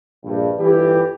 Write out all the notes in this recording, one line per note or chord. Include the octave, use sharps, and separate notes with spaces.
A#1 G2
G1 E3 G4